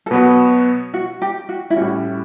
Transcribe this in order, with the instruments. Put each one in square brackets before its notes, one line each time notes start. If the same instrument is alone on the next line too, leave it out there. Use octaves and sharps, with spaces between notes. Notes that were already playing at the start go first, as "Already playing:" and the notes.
[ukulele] A4
[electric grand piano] B2 F#3 B3 F#4 [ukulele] B4
[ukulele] F#4
G4
F#4
E4
[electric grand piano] A2 G3 C#4 [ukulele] F#4